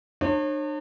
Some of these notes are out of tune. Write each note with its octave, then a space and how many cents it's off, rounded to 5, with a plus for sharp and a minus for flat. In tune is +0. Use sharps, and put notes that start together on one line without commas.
D4 +45 C#5 -35